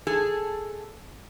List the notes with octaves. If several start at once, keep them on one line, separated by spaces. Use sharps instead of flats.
G#4 A4